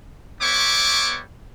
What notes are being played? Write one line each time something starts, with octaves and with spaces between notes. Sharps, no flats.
G3 B3 C#5 E5 C#6 D6